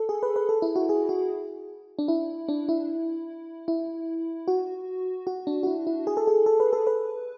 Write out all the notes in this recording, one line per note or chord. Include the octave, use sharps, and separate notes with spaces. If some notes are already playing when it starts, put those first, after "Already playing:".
Already playing: A4
G#4
B4
B4
A4
E4
F#4
G#4
F#4
D4
E4
D4
E4
E4
F#4
F#4
D4
F#4
E4
E4
G#4
A4
G#4
A4
B4
A4
B4